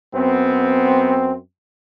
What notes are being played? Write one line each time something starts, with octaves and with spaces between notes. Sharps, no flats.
F#2 B3 C4